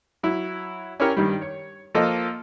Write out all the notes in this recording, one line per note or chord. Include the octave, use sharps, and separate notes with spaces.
F#3 E4
C#4 E4 G4 A#4 C#5 G5
G2 D#3 G3
C#5
F3 A#3 F4 A4 D#5